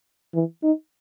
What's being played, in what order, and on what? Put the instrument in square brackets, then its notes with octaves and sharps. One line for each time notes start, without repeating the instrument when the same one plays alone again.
[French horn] E3
D#4